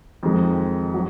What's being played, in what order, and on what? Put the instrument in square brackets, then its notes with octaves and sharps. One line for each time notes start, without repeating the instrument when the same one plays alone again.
[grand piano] F2 D#3 G#3
F#3